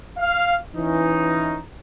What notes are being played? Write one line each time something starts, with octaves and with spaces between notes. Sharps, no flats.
F5
E3 C#4 D#4